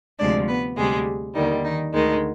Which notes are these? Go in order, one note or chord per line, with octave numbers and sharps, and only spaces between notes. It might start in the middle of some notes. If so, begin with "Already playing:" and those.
D2 C3 F3 G#3 D4 D5
B3 B4
D2 C3 G3 G#3 G#4
D#2 D3 D#3 G3 D#4
D#3 D#4
D2 D3 D#3 G#3 D#4